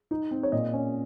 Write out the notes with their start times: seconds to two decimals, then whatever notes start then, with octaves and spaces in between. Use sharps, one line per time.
0.11 D#4
0.31 C4
0.43 C#5
0.52 A#2 D#5
0.73 C#4